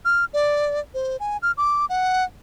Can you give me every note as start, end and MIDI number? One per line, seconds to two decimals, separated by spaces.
0.05 0.25 89
0.34 0.80 74
0.94 1.17 72
1.20 1.37 80
1.42 1.52 89
1.57 1.86 86
1.90 2.24 78